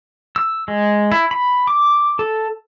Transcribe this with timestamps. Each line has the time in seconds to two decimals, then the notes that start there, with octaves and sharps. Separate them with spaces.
0.36 E6
0.68 G#3
1.12 E4
1.31 B5
1.67 D6
2.19 A4